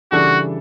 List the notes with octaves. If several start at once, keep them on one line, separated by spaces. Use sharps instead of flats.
C#3 E3 G3 D4 F#4 A4